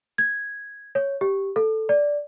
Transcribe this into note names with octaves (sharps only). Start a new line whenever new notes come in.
G#6
C#5
G4
A4
D5